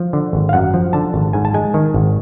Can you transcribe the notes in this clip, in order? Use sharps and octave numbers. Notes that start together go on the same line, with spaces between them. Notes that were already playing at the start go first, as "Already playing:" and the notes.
Already playing: F3
D3
G#1
F5
F#2 F#5
F3
D3 A5
G#1
G#2 G#5
A5
G#3 G#5
D#3
G#1